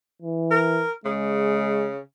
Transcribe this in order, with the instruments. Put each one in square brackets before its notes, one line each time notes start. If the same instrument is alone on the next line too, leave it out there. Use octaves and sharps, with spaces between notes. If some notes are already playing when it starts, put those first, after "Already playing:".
[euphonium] E3
[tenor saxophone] A#4
[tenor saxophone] C#3 [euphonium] G#3